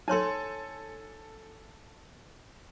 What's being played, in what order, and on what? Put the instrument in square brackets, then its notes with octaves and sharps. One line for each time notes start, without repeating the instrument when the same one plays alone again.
[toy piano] D#4 C#5 C6 [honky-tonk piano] A4 G#5